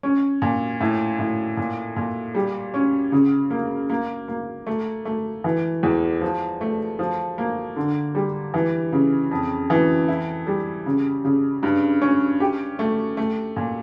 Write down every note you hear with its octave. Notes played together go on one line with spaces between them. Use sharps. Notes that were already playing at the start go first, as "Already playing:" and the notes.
C#4
A#2
A2
A2
A#2
A#2
G3
C#4
C#3
A#3
A#3
A#3
A3
A3
E3
E2
F3
A3
F3
A#3
D3
G3
E3
C#3
F2
E3
E4
G3
C#3
C#3
G2
C#4
G4
A3
A3
A#2